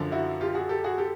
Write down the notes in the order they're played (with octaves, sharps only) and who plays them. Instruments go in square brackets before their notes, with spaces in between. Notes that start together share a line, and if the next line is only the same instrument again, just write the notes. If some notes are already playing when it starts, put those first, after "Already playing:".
Already playing: [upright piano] F#2 D3 F3
E4 F#4
F4 G4
F#4 G#4
G4 A4
F#4 G#4
G4 A4